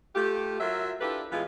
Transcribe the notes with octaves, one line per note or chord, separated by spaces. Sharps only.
A3 F4 G4
F#3 F4 A#4 E5
D4 E4 F4 G4 A4 B4
A2 E3 G#3 B3 F4